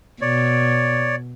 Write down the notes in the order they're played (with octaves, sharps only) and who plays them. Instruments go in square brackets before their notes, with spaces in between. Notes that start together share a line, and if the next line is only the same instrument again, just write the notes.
[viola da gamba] B2 [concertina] C#5 D5